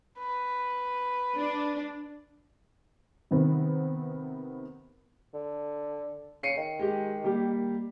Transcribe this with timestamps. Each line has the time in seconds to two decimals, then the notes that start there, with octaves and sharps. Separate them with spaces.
0.18 B4
1.35 D4
3.31 C3 D#3 B3 C4
5.34 D3
6.43 C#3 C7 C#7 D#7
6.57 D#3
6.79 G#3 G4
7.24 G3 A#3 G4